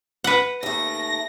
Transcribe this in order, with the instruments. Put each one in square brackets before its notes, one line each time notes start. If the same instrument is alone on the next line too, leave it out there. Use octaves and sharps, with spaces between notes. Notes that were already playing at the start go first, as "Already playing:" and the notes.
[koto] B4 F#5
[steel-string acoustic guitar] D#2 A3 [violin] A#6